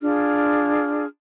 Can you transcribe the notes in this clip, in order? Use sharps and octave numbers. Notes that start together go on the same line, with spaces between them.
D4 F4 G#4 F6